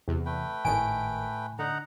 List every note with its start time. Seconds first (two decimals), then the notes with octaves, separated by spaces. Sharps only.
0.08 E2 C3
0.26 A3 B4 G5
0.65 G#1 A2 D#3 G#5 D7
1.59 D3 D#4 F#5 A#5